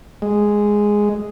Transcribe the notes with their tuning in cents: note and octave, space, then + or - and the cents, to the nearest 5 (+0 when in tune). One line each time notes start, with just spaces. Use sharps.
G#3 -5